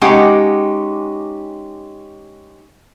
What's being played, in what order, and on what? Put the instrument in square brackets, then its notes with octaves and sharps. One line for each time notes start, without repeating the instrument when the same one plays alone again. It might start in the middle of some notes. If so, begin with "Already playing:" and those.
[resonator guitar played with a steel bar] G#3 C#4 D#4 G4 F#5